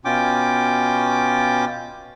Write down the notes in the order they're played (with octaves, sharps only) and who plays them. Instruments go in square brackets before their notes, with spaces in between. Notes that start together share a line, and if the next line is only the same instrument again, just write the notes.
[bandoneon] B2 C#4 F4 G5 D6